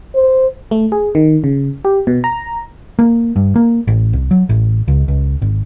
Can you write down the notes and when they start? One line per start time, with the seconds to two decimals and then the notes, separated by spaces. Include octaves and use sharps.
0.15 C5
0.71 A3
0.92 G#4
1.15 D#3
1.44 C#3
1.85 G4
2.07 B2
2.24 A#5
2.99 A#3
3.36 G2
3.56 A#3
3.87 A1
4.13 C2
4.31 F#3
4.49 A1
4.88 C#2
5.08 C#2
5.42 G#1